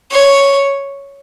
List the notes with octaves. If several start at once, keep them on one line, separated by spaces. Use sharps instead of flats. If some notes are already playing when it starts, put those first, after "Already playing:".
C#5